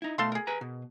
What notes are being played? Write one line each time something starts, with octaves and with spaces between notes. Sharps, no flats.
D#4 E4
B2 A3 A4 F5 C6
G#4 A#4
B4 G#5 A#5
B2